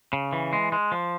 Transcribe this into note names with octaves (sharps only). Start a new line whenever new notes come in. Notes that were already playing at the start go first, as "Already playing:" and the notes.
C#3
E3
G#3
G#3
F3